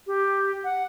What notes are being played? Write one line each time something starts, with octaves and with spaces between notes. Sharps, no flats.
G4
F#5